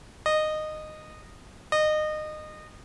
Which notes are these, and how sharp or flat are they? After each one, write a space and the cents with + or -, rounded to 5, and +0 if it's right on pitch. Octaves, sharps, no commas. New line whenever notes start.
D#5 -15
D#5 -25